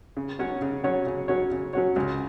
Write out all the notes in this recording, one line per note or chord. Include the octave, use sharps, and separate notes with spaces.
C#3
F#3 C#4 F#4 C#5
C#3
F#3 C#4 F#4 C#5
C#3
F#3 C#4 F#4 C#5
C#3
F#3 C#4 F#4 C#5
C#2